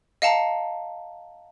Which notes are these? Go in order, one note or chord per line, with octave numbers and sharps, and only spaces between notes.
D#5 F5 F#5 A5 A#5